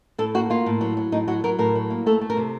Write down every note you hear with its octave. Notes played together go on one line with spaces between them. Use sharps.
A2 A4
A#3 F#4
A#3 F4
A2
F#3
F#3
A2 D#4
F#3 F#4
F#3 A#4
A2 A#4
F#3
A#3
A3 A4
A3
A#4
C3